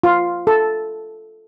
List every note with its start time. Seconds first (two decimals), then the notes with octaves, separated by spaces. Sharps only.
0.03 F4
0.47 A4